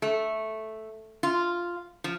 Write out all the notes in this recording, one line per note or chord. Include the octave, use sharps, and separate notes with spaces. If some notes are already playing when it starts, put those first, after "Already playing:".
A3
F4
F3